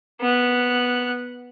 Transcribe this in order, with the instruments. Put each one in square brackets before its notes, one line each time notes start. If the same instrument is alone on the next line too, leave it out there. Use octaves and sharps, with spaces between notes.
[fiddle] B3 F#6